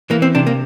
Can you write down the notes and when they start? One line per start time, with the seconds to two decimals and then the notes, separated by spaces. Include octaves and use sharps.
0.10 E3 A#3
0.22 C4
0.35 C3 D4
0.47 A#3